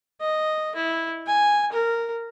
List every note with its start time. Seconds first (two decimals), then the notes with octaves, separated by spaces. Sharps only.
0.21 D#5
0.76 E4
1.27 G#5
1.73 A#4